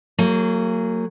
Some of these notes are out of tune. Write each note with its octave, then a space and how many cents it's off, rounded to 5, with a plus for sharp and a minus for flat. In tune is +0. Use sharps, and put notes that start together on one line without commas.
F#3 +0 A#3 -35 G#4 +0